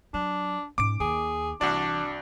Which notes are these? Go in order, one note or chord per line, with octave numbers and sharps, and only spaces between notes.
F#3 D4
G#2 C#4 D6 D7
D#2 G#4
C2 E3 D4 F#4 D5